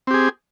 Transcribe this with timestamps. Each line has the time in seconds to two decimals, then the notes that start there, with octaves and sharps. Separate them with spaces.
0.07 C4
0.11 G4
0.14 G#4